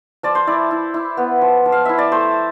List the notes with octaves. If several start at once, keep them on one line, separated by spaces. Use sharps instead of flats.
F3 D5
C5
E4 D5
E4
E4
B3
F3
F3
F5
E4 E5
D5
A3 C5